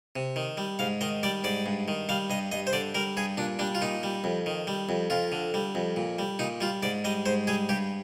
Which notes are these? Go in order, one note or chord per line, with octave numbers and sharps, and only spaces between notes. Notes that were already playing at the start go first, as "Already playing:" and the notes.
C3
D#3
G3
G#2 F5
D#3 D#5
G3 D5
G#2 D5
G2
D#3
G3 F5
G2 D#5
G2 D#5
C5
D3 D5
G3 A#4
G2 G#4
A#2 D4
G3 D4
F4
A#2 D#4
G3
F2
D#3
G3
F2
F2 F4
D3
G3
F2
A#2
G3
A#2 D#4
G3 F4
G#2 D5
G3 D#5
G#2 C5
G3 G#4
G2 G4